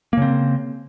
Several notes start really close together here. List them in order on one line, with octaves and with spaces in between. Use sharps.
A#3 C#3 C4